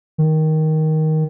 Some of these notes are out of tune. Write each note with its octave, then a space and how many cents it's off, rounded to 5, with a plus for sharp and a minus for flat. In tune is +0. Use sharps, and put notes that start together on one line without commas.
D#3 +10